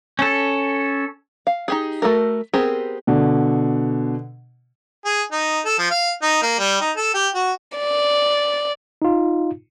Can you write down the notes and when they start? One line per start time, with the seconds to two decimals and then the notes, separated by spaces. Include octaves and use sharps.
0.19 C#4 A4
1.47 F5
1.68 D#4 G4 G#4
2.02 A3 F#4 A4 A#4
2.53 B3 C4 G4 G#4 A#4
3.07 B2 D3
5.05 G#4
5.32 D#4
5.65 A4
5.79 F3
5.90 F5
6.22 D#4
6.42 A#3
6.59 G3
6.81 D#4
6.97 A4
7.14 G4
7.35 F#4
7.78 D5
9.02 D#4 F4